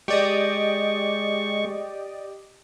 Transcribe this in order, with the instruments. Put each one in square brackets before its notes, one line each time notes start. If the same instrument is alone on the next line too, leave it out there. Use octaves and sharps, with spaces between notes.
[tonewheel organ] G#3 C#6 [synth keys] G4 D5 D#5